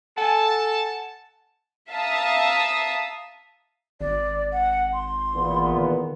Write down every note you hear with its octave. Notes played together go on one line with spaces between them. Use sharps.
A4 F#5 G#5 A5
E5 F5 A5 A#5 D#6 E6
G#1 D5
F#5
C6
E2 A#2 B3
D#3